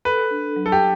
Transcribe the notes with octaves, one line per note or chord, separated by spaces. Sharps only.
A4 B4
D4
F#3
A4
G4